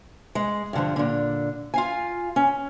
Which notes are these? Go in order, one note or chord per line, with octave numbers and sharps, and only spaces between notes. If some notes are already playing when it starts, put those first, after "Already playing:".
G#3
G2 D3 F3
A#2 D3
F4 F5 G#5
C#4